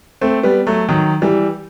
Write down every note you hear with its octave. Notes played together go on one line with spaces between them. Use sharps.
A3 C4
G3 B3
F#3 A3
D#3 F#3
E3 G3